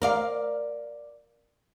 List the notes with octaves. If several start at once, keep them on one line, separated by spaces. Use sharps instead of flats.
A#4 D5 F5